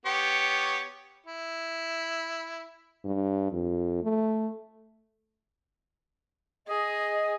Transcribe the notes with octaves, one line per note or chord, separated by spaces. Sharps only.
B3 G4 C#5
E4
G2
F2
A3
G#4 D#5